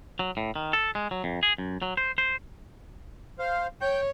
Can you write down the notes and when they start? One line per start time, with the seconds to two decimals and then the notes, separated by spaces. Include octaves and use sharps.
0.19 F#3
0.37 A2
0.56 D#3
0.73 A4
0.95 G#3
1.11 F#3
1.24 F2
1.43 G#4
1.58 F#2
1.82 F#3
1.97 C5
2.18 C5
3.39 C5 F5
3.82 C#5 G5 G6